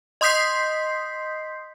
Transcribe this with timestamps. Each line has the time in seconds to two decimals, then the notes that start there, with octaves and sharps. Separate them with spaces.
0.21 D#5 C6 D#6 G6 B6 C7